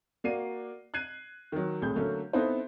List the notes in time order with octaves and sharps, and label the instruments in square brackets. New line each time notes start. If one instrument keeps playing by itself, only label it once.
[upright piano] A#3 F#4 D5 C7 D#7
F#6 G#6 C7 D#7
D#3 F#3
C2 A2 G#4 G6
D3 F#3 A3 A#3 C#4
B3 C4 D#4 E4 A4 C5